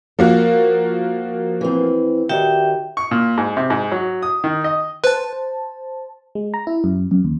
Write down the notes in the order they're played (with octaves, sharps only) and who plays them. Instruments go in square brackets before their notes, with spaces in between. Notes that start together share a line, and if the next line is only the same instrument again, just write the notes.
[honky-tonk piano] F3 A#3 F#4 [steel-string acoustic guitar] A#4
[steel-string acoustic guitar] E3 C4
[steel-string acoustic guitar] D#3 F#4 D5 [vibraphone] G4 E5 G5
[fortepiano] C#6
A#2
G#2
C3
G#2
F#3
D#6
D#3
D#5
[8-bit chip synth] B4 [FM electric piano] C5 A5
[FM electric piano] G#3
A#5
E4
F#2
F#2
D#2